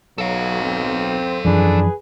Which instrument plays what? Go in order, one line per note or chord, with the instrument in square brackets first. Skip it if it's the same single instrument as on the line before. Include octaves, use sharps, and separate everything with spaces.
[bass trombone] B1 [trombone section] F#3 [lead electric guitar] A4 F5
[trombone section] C4
[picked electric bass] F#2 E3 F3 [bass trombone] D4 [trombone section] G#4 B4